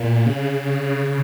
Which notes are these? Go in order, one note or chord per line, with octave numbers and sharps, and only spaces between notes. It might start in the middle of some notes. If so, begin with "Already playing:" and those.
Already playing: A#2
C#3